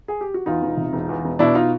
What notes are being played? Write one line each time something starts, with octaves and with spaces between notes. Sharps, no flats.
G#4
G4
F#4
E2 D#4 F4
E1
C3
E1
E2
E1
B2 D4 E4
D#4 F4